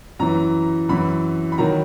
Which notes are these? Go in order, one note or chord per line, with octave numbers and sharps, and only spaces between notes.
F#2 E3 A#5
F#2 E3 B5
B5
D#3 F#3 A#5